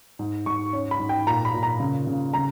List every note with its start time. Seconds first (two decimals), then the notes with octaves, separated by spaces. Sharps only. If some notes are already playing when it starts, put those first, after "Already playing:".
0.19 G#2
0.46 G#2 C#6
0.73 C#4
0.91 B5
1.00 G#2
1.09 G5
1.27 A#2 A#5
1.45 B5
1.54 A#2
1.63 A#5
1.80 C#3
2.07 C#3
2.34 C#3 A#5